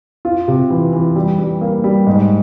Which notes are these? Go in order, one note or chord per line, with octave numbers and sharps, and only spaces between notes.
F4
C3
E3
E3
G3
G3
A#3
G3
G#2